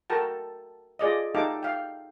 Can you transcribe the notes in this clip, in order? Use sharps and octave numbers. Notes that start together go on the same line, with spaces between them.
F#4 A4 A#4 G5 A5
F4 G#4 D5 D#5
D#4 G4 A4 F5 G5 D6
F5 G5